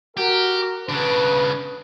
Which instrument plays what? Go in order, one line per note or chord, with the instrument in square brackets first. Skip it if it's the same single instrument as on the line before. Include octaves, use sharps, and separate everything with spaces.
[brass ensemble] F#4 A#4 [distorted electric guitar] G4
[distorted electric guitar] C#3 D4 [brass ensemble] B4